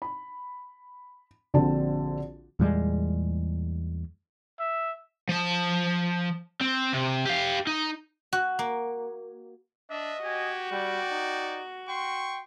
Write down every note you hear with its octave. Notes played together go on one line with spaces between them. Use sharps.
B5
A#1 D3 C4 F#4 A5
E2 A#2 G3 G#3
E5
F3 A5
C4
C3
G4 F5
D#4
F#4
A#3
D4 D#5 E5
F#4 G4 G#5
G3 D5 G5
D#4
G5 C6 C#6